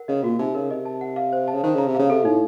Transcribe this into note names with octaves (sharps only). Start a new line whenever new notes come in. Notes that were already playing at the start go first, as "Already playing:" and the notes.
Already playing: A#4 F#5
C#3 D#5
A#2 F#4
C3 D#4
C#3 A#4
C3 D#5
A5
F#5
F5
C5
A5
C#3
D#3 C5
C#3 A#5
C3
C#3 F5
C3 A4
A2 D#4